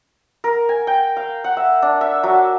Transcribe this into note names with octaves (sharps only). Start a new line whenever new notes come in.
A#4
G#5
G5
F5
F#5
E5
D4
E5
F#3